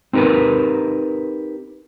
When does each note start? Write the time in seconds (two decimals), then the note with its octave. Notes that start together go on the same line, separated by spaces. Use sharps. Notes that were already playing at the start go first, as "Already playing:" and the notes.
0.13 C4 D#4 G4 A#4 B4